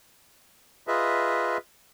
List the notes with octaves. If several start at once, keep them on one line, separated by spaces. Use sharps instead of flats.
F4 G#4 B4 D#5 E5